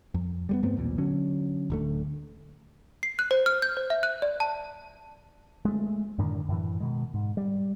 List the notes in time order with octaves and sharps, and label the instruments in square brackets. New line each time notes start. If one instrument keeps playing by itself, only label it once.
[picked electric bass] F2
G3 G#3 B3
G2 A3 B3 C4
B1 E2 A#2
D3 F#3 C#4
D1 D3 A3
[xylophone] C7
F#6
C5
F6
G6
C5
E5
F#6
D5
A5
[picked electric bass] G#3 A3
F#2 A2 D3 D#3
F#2 A2 E3
B2 D#3 G#3
G#2
G3